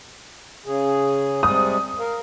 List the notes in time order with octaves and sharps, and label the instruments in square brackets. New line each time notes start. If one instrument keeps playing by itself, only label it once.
[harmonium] C#3 G#4
[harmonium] C3 G3 G#3 [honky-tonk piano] D#6
[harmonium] A#4 F5